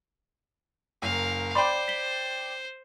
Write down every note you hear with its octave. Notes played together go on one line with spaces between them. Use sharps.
F#1 A#4 F5
C5 D5 G5 B5 C6 D6
B6 G7